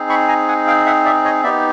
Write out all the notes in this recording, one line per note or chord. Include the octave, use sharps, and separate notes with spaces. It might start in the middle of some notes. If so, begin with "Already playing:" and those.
Already playing: C4 D#4 G#4
B5 C#6
G#5 A#5
F#5 G#5
F5 G5
E5 F#5
D5 E5
C#5 D#5
B3 D#4 G4 D5 E5